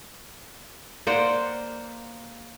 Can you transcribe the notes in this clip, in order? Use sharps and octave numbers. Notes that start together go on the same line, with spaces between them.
A#3 C5 D5 F#5